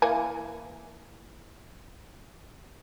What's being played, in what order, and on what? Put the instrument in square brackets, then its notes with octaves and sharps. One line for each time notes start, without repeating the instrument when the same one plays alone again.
[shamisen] E3 A#3 G#5